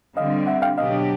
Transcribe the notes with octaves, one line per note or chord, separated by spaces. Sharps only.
D3 G3 C4 D#5 F5
E5 F#5
F5 G5
B2 F#3 B3 D4 G4 D#5 F5